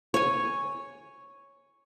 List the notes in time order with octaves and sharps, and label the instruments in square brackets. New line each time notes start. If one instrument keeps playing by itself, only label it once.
[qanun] C#5 G#5